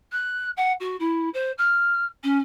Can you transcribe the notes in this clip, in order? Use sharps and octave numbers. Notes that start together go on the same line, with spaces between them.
F#6
F#5
F#4
E4
C5
F6
C#4